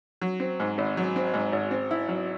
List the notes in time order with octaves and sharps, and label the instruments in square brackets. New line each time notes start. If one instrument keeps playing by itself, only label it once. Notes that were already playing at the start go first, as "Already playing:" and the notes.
[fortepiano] F#3
C4
G#2
G#1
F#3
C4
G#2
G#1
C4
E4
F#3